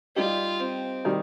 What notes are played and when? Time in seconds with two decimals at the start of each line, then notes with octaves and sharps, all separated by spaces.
0.16 G3 D#4 F4 G4
0.60 C4
1.05 D#3 G3